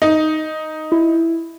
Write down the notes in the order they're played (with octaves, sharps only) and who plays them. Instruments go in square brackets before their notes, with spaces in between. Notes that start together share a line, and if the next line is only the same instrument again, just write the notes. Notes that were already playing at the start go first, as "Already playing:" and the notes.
[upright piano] D#4
[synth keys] E4